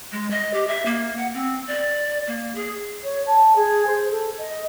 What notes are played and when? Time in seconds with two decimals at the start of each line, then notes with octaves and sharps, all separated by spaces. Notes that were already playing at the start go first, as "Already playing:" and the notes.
0.12 G#3
0.30 D#5
0.54 G4
0.67 E5
0.86 A#3
1.18 F#5
1.34 C4
1.67 D5
2.27 A#3
2.55 G#4
3.03 C#5
3.26 A5
3.55 G#4
3.86 C5
4.10 A4
4.37 D#5